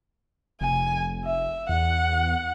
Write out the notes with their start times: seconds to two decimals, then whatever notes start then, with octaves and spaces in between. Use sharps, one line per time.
0.61 F1 G#5
1.25 E5
1.69 E2 F#5